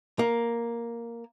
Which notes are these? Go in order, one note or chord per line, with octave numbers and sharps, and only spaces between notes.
A#3